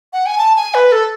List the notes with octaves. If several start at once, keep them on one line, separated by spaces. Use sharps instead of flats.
F#5
G#5
A5
G#5
B4
A4